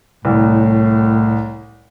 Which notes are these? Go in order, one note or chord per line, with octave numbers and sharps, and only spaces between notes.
C2 A2